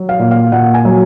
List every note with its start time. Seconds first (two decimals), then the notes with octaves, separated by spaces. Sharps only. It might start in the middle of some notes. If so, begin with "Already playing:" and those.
Already playing: F#3
0.09 F5
0.19 A#2
0.31 F5
0.52 A#2 F#5
0.74 G#5
0.85 F#3